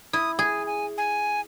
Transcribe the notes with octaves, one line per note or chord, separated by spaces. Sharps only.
E4 D#6
G#4 G#5
G#5
G#5